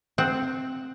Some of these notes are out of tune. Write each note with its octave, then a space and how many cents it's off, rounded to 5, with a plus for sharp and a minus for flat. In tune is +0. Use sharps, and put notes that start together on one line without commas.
C4 +0 F#5 +0